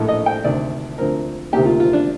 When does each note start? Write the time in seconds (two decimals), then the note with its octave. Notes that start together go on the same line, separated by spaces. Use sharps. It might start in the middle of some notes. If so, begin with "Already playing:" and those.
Already playing: A#1 A2 A3
0.08 D#5
0.26 G5
0.44 D2 C3 D#3 D5
0.98 D2 D3 F3 C4 A#4
1.53 D2 C3 D#3 A#3 G4
1.65 F4
1.80 F4
1.93 D4